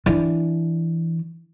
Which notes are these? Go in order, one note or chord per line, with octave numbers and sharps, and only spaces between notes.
E3 D4